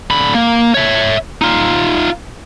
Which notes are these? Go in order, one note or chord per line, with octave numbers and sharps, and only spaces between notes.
D3 B5
A#3
C#5 E5
D#4 F4